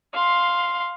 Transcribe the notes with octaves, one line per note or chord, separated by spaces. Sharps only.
F5 C6